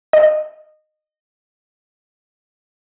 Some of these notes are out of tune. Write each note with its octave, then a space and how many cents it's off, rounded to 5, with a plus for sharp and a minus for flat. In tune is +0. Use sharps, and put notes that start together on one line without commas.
D#5 -20